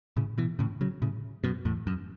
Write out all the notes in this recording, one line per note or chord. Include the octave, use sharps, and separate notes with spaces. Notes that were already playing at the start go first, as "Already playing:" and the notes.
A2 C#3
B2 E3
A2 C#3
C#3 F#3
A2 C#3
F#2 B2
E2 A2
F#2